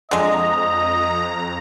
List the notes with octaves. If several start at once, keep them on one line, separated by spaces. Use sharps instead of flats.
F2 D3 G#3 D#5 A#5